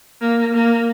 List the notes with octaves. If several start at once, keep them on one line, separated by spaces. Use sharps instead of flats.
A#3
A#3